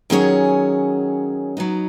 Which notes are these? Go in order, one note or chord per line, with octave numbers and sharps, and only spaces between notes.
D#3 F#3 C#4 G#4 C#5
F#3 B3 D#4